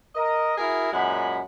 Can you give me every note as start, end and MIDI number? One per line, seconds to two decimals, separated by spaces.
0.15 0.54 70
0.15 0.54 75
0.57 0.90 64
0.57 0.90 66
0.57 0.90 68
0.57 0.90 70
0.92 1.39 42
0.92 1.39 46
0.92 1.39 56
0.92 1.39 78
0.92 1.39 83